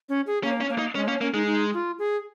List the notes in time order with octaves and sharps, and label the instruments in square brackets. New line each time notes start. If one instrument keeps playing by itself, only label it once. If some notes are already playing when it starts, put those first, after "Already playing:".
[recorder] C#4
G#4
[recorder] A#3 [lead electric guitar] C#4
[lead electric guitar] C#4
[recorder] A#3
[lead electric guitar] D#4
[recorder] G#3 [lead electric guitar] C#4
[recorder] A#3 [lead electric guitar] C#4
[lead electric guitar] A#3 [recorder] C#4
[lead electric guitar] G#3 [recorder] D#4
[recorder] D#4
F4
G#4